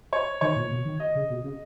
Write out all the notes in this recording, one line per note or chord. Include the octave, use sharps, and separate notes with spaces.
C#5
D#3 C#5
A#2
B2
D#3
D#5
C#3
B2
C#3